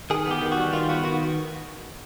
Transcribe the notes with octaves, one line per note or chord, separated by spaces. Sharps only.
D#3 G#4
B3
G4
D#3
F#4
G3
D#3 F4
B3 F#4
D#3 F#4